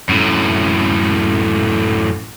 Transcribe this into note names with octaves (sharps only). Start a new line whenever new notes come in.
F#2 A2